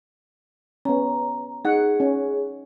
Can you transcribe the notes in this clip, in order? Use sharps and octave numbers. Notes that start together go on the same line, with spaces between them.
B3 C#4 A#5
D#4 G#4 F#5
C#4